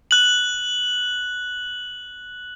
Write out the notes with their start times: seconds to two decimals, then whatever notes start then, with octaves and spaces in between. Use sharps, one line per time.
0.11 F#6 F#7